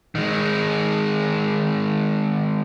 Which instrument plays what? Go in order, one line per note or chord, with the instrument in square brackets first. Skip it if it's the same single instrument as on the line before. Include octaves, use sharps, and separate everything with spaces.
[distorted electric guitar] D#3 G#3